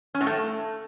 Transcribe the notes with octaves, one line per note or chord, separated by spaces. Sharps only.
C#4
A2
A3